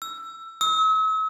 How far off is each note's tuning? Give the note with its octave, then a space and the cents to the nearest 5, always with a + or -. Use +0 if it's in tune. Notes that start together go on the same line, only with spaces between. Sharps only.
E6 +15
E6 -45